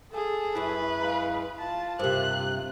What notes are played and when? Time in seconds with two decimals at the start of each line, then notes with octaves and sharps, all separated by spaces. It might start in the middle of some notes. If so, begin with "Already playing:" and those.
0.11 G#4 A4
0.55 F#2 E4 B4
1.01 G#3 F5 A#5
1.59 F4 A5
1.99 G2 C3 G4 A#4 C5 F#6